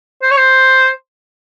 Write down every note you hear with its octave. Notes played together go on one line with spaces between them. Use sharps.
C5
C#5
C5